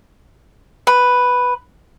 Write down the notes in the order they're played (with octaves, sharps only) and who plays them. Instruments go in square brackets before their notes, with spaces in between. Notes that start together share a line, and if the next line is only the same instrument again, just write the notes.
[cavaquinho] B4